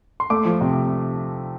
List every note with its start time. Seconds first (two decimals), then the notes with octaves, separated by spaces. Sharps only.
0.20 C6
0.30 A3 D6
0.45 F3
0.61 C3